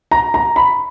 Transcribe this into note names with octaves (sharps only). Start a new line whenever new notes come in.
A#5
A#5
B5